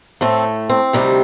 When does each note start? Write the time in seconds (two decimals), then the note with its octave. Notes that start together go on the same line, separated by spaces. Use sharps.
0.21 A2 A3 C4
0.69 C4
0.93 D2 C3 D#3 G3